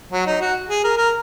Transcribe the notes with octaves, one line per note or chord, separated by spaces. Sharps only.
F#3
D#4
F#4
G#4
A#4
A#4